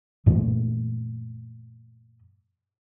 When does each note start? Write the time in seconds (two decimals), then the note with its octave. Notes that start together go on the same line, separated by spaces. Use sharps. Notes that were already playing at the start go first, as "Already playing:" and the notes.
0.26 F#2 A#2 E3 A3